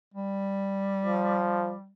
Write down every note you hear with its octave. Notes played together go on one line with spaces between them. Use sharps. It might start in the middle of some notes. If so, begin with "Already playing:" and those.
G3
F3